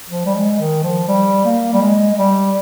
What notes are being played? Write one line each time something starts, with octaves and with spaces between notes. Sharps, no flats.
F3
G3
G#3
D#3
F3
G3
A#3
G3
G#3
G#3
G3